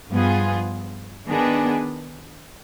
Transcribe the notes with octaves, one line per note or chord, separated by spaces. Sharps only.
G2 F3 B3 F4 G#4
D#3 B3 D4 G#4 B4